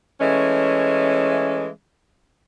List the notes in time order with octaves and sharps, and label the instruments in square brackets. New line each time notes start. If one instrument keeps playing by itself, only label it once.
[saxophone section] E3 G#3 A3 C#4